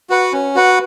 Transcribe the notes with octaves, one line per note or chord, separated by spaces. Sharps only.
F#4 B4 F#5
C#4
F#4 B4 F#5